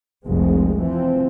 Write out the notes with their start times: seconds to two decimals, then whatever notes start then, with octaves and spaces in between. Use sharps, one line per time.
0.24 F1 C2 G#3 C4
0.81 E3 F3 C4